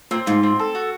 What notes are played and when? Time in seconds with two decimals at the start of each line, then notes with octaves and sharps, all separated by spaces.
0.11 A#2 C4
0.26 G#2 F4
0.43 C4
0.60 A4
0.75 F#4